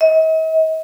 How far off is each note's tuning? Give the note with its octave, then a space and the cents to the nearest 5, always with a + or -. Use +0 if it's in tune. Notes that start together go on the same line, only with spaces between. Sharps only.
D#5 +45